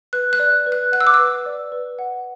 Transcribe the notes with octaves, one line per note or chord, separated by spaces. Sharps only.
B4 F#6
F#6
D5
B4
F#6
F#5 F#6
E6
D6
B4 E6
D5
B4
F#5